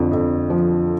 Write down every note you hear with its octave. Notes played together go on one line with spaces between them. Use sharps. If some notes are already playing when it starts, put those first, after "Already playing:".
Already playing: F2 D3
F2
F3